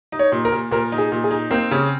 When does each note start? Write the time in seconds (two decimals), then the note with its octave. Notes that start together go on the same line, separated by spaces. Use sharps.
0.12 D#4
0.19 C#5
0.32 A#2
0.45 A#4
0.52 A#2
0.71 A#2 A#4
0.92 D#4
0.98 G#4
1.12 A#2
1.24 G#4
1.31 D#4
1.51 A#3 C4
1.71 C#3